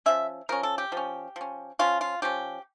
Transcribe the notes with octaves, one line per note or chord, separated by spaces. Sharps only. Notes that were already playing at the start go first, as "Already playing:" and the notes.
F3 C#4 E5
F3 C#4 A#4
A4
G4
F3 C#4
F3 C#4
F3 C#4 F4
F4
F3 C#4 G4